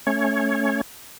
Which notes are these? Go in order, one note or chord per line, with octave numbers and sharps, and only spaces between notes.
A3 C#4 C#5